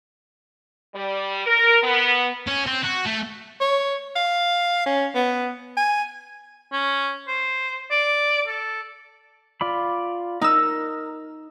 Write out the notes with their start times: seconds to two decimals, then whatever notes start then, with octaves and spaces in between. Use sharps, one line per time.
0.95 G3
1.46 A#4
1.83 B3
2.47 C#4
2.67 C4
2.83 F#4
3.06 A3
3.61 C#5
4.16 F5
4.86 C#4
5.15 B3
5.77 G#5
6.72 C#4
7.28 C5
7.91 D5
8.48 A4
9.61 F4 D5 B5
10.41 D#4 A#4 E6